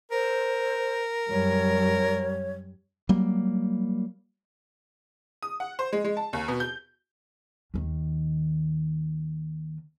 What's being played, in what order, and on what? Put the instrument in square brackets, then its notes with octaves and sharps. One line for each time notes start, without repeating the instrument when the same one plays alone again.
[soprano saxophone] A#4 [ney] C5
[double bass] F#2 G3 [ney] C#5
[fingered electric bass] F#3 G3 A#3
[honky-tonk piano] D#6
F#5
C5
G#3
G#3
A5
D#2
B2
G6
[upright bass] D#2 D#3